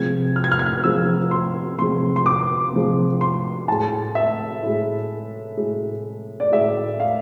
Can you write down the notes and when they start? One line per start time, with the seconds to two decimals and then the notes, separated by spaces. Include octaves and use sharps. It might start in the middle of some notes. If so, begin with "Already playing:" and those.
Already playing: C3 F3 G#3 G#6
0.36 F6
0.44 G#6
0.52 F6
0.59 G#6
0.66 F6
0.84 C3 F3 G#3 E6
1.31 C6
1.78 C3 F3 G#3 C6
2.16 C6
2.26 D6
2.73 C3 F3 G#3
3.21 C6
3.68 A2 G#3 A5
4.15 E5
4.62 A2 G#3
5.57 A2 G#3
6.40 D5
6.52 A2 G#3 E5
7.00 F5